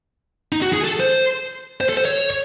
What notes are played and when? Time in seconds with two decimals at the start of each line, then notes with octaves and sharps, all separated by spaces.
0.52 D#4
0.62 F#4
0.73 G#4
0.84 A4
1.00 C5
1.81 C5
1.89 A4
1.97 C5
2.05 C#5